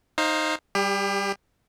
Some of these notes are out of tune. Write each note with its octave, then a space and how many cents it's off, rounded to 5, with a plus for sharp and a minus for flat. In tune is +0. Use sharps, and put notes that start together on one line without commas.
D#4 +0 C5 +25 F5 +0
G3 +0 G4 +35